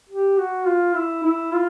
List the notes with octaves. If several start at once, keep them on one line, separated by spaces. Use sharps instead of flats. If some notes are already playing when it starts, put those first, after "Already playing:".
G4
F#4
F4
E4
E4
F4